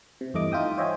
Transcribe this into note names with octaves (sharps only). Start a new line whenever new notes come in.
C3
E2 G2 A3 D#5 D6
D#4 F4 E5 G5 D#6
C5 C#5 D#5 E5 G5 G#5